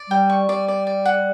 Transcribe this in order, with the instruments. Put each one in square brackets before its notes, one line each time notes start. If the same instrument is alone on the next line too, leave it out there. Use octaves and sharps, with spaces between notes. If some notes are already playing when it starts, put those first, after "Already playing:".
Already playing: [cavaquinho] D5
[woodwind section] G3 [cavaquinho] G5
[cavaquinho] C#6
[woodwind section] G3 [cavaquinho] D5
[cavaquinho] D5
D5
F#5